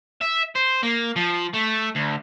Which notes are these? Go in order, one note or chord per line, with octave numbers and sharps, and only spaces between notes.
E5
C5
A#3
F3
A3
D2